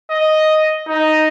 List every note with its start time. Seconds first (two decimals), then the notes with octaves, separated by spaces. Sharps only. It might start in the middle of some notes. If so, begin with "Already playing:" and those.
0.11 D#5
0.87 D#4